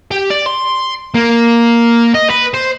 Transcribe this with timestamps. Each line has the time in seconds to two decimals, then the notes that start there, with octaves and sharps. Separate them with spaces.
0.11 G4
0.30 D5
0.46 C6
1.14 A#3
2.15 D#5
2.30 B4
2.54 C5